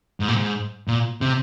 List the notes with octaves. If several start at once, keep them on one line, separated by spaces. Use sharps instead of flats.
G#2
A#2
G#2
A#2
C3